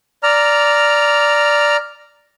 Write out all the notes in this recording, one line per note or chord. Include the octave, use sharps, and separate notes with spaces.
D5 A#5 F6